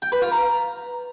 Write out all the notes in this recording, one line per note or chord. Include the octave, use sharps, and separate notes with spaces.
G5
B4
F4
A#5